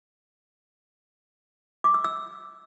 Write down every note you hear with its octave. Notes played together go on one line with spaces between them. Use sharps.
D6
E6
E6